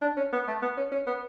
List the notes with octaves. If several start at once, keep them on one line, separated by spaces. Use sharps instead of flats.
D4
C#4
B3
A3
B3
C#4
C#4
B3